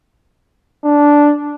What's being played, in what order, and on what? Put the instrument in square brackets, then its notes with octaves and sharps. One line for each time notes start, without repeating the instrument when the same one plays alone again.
[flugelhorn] D4